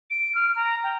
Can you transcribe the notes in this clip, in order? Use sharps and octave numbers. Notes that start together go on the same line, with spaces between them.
D7
F6
A#5
G5